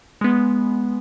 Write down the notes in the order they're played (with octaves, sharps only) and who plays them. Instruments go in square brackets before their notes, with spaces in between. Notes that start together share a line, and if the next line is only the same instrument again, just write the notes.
[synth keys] G#3 B3